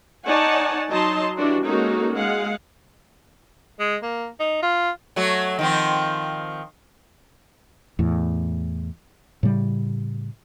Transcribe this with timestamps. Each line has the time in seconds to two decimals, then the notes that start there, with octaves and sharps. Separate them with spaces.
0.25 D#4 C#5 D5 F#5 G#5 A5
0.89 F#3 D#4 D#5 A5 C6
1.37 E3 G3 D4 F#4
1.65 G#3 A#3 C#4 D#4 F#4 A4
2.14 G#3 F5 F#5
3.79 G#3
4.02 A#3
4.40 D#4
4.63 F4
5.16 F#3 A3 F#4
5.59 D#3 F3 C4
7.99 E2 A2
9.43 A2 C#3 G3